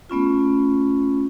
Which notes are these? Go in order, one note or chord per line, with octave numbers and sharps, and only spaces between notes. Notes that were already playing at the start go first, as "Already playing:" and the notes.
A3 B3 C#4 F4